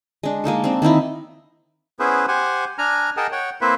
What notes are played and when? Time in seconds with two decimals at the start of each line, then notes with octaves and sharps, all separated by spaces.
0.23 G#3 D4
0.44 G#3 A#3 D#4 A4
0.64 C4 D4
0.82 D#3 C4 D#4 E4
1.99 B3 C#4 E4 G#4 B4 C5
2.28 G4 C5 F#5 G#5
2.78 D4 G#5 A#5 F6
3.17 G#4 A#4 D#5 F#5 G5 A5
3.32 C#5 F#5 G5
3.61 A#3 C4 E4 B4 C5 E5